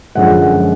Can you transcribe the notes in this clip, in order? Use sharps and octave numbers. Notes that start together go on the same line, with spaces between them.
F#2 D3 F3 G#3 F#5